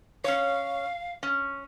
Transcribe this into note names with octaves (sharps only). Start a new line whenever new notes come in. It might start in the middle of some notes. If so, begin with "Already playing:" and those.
C#4 C#5 F5
C#4